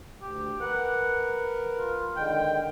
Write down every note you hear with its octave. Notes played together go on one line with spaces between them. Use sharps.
D2 G4
A#4 B4 F#5
F4
D3 D#3 G#3 G5